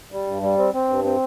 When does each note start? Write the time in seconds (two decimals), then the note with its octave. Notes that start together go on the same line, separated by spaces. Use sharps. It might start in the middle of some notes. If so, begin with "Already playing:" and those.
0.12 G3
0.27 G2
0.42 G3
0.58 C4
0.74 C4
0.88 G2
1.04 C4